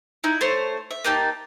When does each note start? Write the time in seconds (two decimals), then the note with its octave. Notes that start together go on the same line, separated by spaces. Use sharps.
0.24 D#4 E4
0.41 A3 C5 C#5
0.91 E5
1.05 A#3 D#4 G4 A5